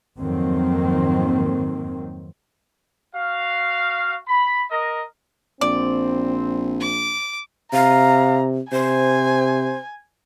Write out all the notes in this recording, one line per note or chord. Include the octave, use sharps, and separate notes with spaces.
F2 G#2 D#3 F#3 A#3 C4
F#4 F5
B5
A#4 D#5
A#1 C4 D5
D6
C3 F5 A#5
C3 C5 G#5